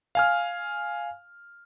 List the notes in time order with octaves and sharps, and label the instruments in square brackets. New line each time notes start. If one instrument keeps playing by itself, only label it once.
[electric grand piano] F5 G#5 F6